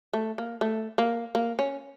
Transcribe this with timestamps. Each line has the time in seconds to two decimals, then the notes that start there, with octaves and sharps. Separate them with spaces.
0.13 A3
0.38 A#3
0.61 A3
0.98 A#3
1.35 A#3
1.59 C#4